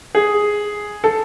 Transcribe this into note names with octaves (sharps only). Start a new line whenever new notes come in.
G#4
A4